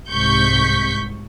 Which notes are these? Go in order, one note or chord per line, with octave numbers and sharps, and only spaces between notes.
C2 G#2 C3 C#6 G6 B6